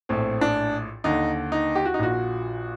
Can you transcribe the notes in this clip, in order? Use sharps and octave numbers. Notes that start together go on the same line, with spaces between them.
A#1 A2 C4
D4
D#2 D3 D#4
D#4
G4
F#4
D#4
A#1 A#2 F#4